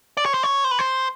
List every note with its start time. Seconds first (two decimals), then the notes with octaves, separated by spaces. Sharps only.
0.17 D5
0.26 C#5
0.34 C5
0.43 C#5
0.64 C5
0.71 B4
0.79 C5